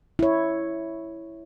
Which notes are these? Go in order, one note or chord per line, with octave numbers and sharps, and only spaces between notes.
E4 C#5